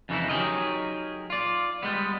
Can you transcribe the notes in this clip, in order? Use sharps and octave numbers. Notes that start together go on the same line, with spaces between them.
F2 C#3 E3 D#4 E4
F#3 D#4 G4 G#4 A#4 D#5
F4 D5
G3 G#3 B3